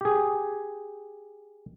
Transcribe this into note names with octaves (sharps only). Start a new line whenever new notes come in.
G4 G#4